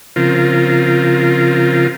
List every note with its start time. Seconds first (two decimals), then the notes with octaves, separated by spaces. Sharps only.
0.16 C#3 F3 C4 F4 A#4